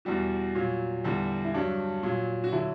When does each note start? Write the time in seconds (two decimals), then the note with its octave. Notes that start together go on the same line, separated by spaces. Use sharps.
0.05 E2 B2 G3 F#4
0.55 A#2 F#3
1.04 E2 D3 G3
1.44 E4
1.54 G2 F#3 D4
2.03 A#2 F#3
2.44 F#4
2.52 D3 F#3 E4